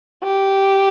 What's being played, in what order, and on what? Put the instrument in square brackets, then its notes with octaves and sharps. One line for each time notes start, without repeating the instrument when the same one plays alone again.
[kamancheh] G4